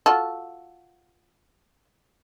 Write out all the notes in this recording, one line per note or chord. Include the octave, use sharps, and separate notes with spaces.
F4 F#4 A4